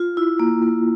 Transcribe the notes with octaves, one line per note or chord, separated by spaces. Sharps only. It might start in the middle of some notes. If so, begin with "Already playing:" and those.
Already playing: F4
E4
A#3
A#3